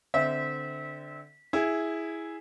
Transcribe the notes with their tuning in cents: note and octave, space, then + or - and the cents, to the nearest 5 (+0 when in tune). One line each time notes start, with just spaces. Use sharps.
D3 +0 C4 -15 E5 -25
E4 -5 G#4 +0